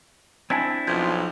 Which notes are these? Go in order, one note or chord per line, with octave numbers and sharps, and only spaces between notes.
C4 D4 E4 G#5 A5 G#6
B1 F3 G6 G#6